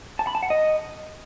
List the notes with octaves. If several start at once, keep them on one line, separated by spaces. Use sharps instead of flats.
A5
B5
A5
F#5
D#5